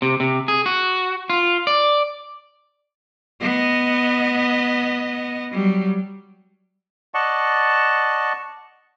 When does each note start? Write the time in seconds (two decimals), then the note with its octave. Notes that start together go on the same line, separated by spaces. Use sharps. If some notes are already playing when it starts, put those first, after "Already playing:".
0.02 C3
0.20 C3
0.48 G#4
0.66 F#4
1.30 F4
1.67 D5
3.42 B3 D#5
5.52 F#3 G3
7.14 D5 D#5 F#5 A5 C#6